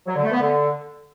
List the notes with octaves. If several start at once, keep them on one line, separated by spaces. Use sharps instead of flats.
F#3
D3
A3
B3
D3